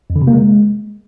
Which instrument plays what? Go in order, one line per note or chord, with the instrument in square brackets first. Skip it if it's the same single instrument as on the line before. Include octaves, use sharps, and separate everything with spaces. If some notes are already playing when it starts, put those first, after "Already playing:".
[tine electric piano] F2
D3
C3
A#3
G#3